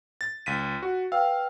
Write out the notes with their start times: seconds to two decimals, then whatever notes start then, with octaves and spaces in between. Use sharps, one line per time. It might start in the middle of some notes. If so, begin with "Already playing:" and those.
0.21 A6
0.46 C#2 B6 D#7
0.82 F#4
1.12 B4 F5 G5 E6